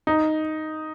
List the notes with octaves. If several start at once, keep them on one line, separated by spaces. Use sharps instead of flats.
D#4